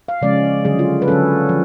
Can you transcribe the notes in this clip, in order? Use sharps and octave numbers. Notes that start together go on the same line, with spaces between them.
F5
C#3 F3 G#3 C#4 D5
D3 F#3 C#4 G#4
F4
B4
D3 F#3 C#4 A4
F3